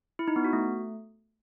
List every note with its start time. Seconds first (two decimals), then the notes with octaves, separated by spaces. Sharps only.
0.19 E4
0.28 D#4
0.36 B3
0.44 F#4
0.53 A3